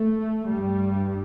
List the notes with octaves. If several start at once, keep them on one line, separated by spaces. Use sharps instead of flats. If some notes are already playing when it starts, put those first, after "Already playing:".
Already playing: A3
G2 G3